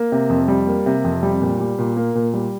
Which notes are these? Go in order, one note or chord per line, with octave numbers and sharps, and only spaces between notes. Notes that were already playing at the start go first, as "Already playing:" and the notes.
Already playing: A#3
C3
F2
G3
A#3
C3
F2
G3
A#2
G3
A#2
A#3
A#2
G3